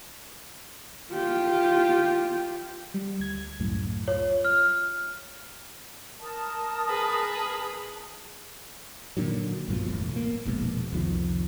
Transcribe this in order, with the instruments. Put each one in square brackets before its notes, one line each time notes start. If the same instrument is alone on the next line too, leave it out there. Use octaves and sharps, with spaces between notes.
[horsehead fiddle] F4 G4
[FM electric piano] G3
D2 G#6
C#2 F#2 A2
[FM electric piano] F4 [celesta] C#5
[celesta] F6
[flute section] A#4 A5 D#6
[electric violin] G#4 B4
[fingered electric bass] A#2 D3 D#3 F#3
A#1 G2 B2 F3
E1 A2
A#3
F1 A#1 G#2 B2
C2 F2 D#3 F3